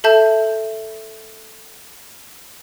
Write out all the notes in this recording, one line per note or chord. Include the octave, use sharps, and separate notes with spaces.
A4 E5 A5 G6